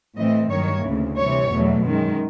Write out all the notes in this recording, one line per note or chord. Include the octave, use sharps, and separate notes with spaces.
A2 E3 A3 C4 D#5
G2 D#3 F#3 A#3 C#5
D2 C#3 E3
C3 E3 G3 C#5
E2 B2 F#3 A3
F#2 D#3 G#3